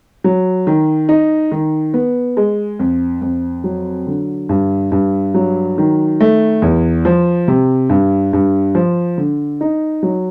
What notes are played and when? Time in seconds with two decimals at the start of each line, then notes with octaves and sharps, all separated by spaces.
0.24 F#3
0.67 D#3
1.09 D#4
1.52 D#3
1.94 B3
2.37 G#3
2.79 F2
3.22 F2
3.64 F#3
4.07 D3
4.49 G2
4.92 G2
5.34 F#3
5.78 D#3
6.20 A3
6.62 E2
7.05 F3
7.48 C3
7.90 G2
8.33 G2
8.75 F3
9.18 D3
9.61 D#4
10.03 F#3